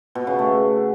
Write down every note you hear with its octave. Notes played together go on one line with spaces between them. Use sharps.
B2
C#3
A3